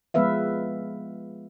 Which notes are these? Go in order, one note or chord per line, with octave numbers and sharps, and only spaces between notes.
F3 G#3 B3 B4 E5 F5